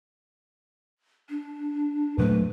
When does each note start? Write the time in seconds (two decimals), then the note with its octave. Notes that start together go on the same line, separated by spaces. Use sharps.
1.29 D4
2.18 A#2 F#3 A3 B4